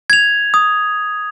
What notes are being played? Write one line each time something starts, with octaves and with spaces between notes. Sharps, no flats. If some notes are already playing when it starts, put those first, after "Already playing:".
G#6 F7
D#6